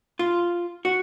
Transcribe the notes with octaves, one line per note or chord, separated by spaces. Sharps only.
F4
F#4